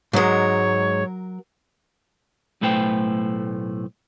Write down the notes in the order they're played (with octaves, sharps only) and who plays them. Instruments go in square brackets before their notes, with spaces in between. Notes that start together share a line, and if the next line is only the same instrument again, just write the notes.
[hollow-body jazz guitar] G#2 G#3 [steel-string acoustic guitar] F#3 A#4 [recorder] C#5
[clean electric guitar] B1 A2 A3 B4 C5 G5